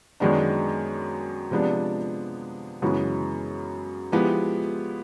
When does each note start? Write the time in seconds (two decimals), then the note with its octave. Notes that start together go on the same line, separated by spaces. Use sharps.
0.20 F#2 D#3 G#3 B3 D4
1.51 C3 F3 G#3 B3 D4
2.82 F#2 C#3 E3 G#3 B3
4.12 F3 G#3 B3 E4 G4